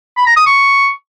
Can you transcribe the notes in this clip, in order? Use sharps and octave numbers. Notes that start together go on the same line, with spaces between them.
B5
A#5
D#6
C#6